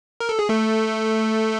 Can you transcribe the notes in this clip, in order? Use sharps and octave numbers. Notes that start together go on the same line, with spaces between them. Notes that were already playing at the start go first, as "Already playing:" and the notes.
A#4
A4
G#4
A3 A4